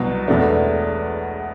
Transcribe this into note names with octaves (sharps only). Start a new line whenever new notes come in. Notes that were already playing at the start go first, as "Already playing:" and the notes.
Already playing: C2 B2 F#3
E1 E2 B2 A3 D4